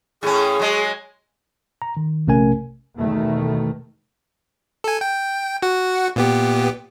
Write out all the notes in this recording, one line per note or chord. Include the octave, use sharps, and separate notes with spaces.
A2 C#4 G#4
F#3 G#3
A#5
D#3
A#1 C3 A3 C#4 A#4 G#5
E2 B2 D#3 A3
A4 G#5
G5
F#4 F#5
A#2 B3 G4